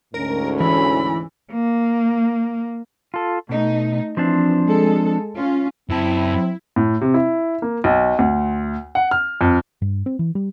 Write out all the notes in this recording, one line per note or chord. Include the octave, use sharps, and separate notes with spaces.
D2 G#2 C#4 A#4
E3 B5
A#3
F4 A4
B2 A3 D#4
E3 F3 C4 D4
G#3 A4
C#4 F4
F#2 C4 E4 A5
A2
C3
E4
A#3
B1
D2
F#5
F6
F2
G2
C4
E3
G3